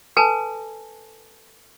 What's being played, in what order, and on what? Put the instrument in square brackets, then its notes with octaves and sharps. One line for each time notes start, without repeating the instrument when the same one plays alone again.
[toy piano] A4 B4 G#5 A5